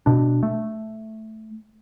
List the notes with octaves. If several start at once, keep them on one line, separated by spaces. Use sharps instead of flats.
B2 D4
A3